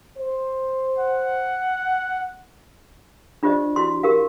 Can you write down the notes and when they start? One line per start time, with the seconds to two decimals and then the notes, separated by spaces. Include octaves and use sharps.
0.18 C5
0.99 F#5
3.43 D4 F4 G4 C5 D5 D#5
3.76 E4 F#4 C6
4.03 G4 A#4 F5